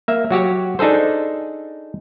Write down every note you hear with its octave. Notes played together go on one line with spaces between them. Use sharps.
A#3 E5
F#3 F#4 G4 C#5
D4 D#4 G#4 A4 C5